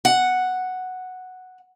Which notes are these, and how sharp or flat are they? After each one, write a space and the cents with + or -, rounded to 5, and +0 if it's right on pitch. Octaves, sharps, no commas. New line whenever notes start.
F#5 +0